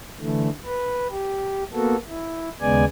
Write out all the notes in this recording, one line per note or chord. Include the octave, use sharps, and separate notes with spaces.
D3 E3 A3
B4
G4
A#3 B3 F#4 A4
E4
D#2 C#3 G#3 B3 D5 G#5